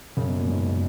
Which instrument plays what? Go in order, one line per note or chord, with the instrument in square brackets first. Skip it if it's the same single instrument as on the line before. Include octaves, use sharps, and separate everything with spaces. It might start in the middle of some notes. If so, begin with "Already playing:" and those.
[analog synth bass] F#2 [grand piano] C#3
[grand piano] B2
A#2
G#2